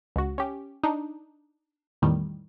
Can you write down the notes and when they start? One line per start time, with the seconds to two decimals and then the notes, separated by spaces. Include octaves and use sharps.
0.16 C#2 F#4
0.38 C#4 G4
0.83 D4 D#4
2.02 E2 A2 D#3 G3